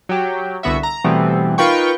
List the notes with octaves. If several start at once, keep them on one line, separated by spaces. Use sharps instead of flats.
F#3 G4
C2 D3 B3 F#4 E5
A#5
B2 E3 G3 A3 B3 C4
D#4 F4 A#4 B4 G5 C#6